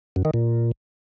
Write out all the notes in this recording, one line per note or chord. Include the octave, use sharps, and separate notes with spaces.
F#2
D#3
A#2